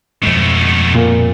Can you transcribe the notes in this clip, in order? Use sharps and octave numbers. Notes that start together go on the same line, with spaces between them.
F2 B2 G#3 A3
A#2